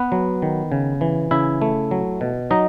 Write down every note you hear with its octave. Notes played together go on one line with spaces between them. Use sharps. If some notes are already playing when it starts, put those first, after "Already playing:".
Already playing: B3 B4
F#3
D#3
C#3
E3
C#3 E4 E5
A3
F#3
B2
F#3 D#4 D#5